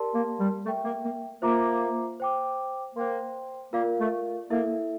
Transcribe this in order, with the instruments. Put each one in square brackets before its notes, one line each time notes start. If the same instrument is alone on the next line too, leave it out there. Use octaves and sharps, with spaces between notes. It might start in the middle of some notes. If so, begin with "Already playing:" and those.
Already playing: [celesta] G4 A#4 D5 A5 C6
[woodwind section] A#3
G3
[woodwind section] A3 [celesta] A#4 E5 G5
[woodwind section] A#3
A#3
[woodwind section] A#3 [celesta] F4 C5 E5 A#5 D6
[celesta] C5 G5 D6
[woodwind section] A#3 [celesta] C5 G5 C6
[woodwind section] A#3 [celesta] F4 A#4 D5 F5
[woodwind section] A3
[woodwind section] A#3 [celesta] E4 A4 E5